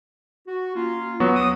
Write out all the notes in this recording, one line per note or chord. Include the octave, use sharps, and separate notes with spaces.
F#4
A#3 C#4 F4
F#3 B3 F#4
D#2 D6 D#6